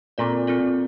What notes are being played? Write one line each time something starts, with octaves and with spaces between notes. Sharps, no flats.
A#2 C4 F4 A4 D5
C4 F4 A4 D5